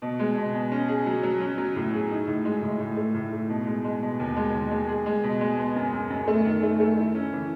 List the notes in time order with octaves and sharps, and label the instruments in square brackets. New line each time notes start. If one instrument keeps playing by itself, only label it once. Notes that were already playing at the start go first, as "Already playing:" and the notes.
[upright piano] B2
G#3
B2
B2
C#4
G#4
F#3
F#3
C#4
F#3
A2
G#4
D#4
A2
G#3
A2
A2
A3
A2
A2
B2
G#3
G#3
B2
D#2
G#3
D#2
G#3
G#4
G#3
B2
G#3
B3
F#2
F#2
F#2
A3
D#3
A3
A3
E4
C#4
E3